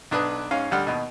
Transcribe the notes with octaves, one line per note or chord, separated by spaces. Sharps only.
B1 D4 B4 D#6 F#6
G#2 C#4 F5
D2 G3 F#5 F6
D#2 B2